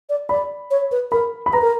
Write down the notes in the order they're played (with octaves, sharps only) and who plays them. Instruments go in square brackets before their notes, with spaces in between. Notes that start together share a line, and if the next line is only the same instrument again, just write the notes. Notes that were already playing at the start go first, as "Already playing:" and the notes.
[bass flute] D5
[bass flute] D5 [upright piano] B5
[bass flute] C#5
B4
[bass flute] A#4 [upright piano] B5
[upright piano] B5
[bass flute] B4 [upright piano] A#5
[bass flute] A#4